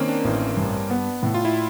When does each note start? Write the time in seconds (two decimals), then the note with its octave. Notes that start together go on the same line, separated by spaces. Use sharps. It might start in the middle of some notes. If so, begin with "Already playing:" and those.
Already playing: D#3 A#3 C4 C#4
0.08 D4
0.25 A1
0.57 G2
0.90 B3
1.23 A2
1.34 F4
1.45 E4